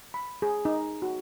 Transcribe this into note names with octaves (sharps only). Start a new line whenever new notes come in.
B5
G#4
D#4
F#4